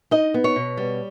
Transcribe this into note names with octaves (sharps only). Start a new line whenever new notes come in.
D#4 D#5
B3
C#5
B2
G3